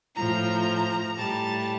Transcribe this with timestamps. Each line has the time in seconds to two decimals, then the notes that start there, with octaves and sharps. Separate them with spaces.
0.17 A2 F3 A#5
1.18 A2 G3 A5